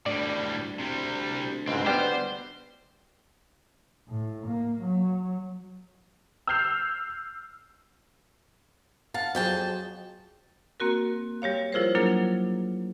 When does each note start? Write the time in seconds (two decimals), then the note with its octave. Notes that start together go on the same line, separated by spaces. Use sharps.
0.06 D2 A2 G3 D5
0.79 C3 G3
1.68 C#2 G#2 C4
1.86 G3 B3 G4 C5
4.09 A2
4.47 A#3
4.82 F#3
6.47 E6 F6 G6 C7 F7
9.14 F5 F#5 A5
9.35 F2 F#3 G#4 G5 A5
10.80 A#3 C4 F#4 A#4
11.42 G3 G4 C#5 F5
11.73 F3 E4 F4 G#4 A#4 C5
11.95 F#3 A#3 D4 F4 G#4 A#4